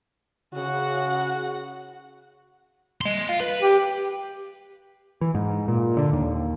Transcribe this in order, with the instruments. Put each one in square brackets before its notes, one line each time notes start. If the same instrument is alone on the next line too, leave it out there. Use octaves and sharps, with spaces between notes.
[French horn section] C#3 [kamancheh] F#4 F#5
[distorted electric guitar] D#5 C6
F5 C6
B4
[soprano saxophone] G4
[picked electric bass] E3
G#2
A#2
D3
D#2